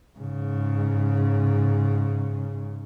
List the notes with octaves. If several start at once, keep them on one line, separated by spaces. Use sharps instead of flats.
G#2 C#3